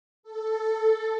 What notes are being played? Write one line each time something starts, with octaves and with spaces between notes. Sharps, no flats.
A4